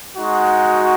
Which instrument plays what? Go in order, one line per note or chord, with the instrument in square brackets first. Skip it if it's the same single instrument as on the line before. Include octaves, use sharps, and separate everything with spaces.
[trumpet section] G#3 D#4 F#4